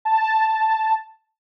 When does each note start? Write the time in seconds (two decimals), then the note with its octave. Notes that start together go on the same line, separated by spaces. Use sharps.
0.05 A5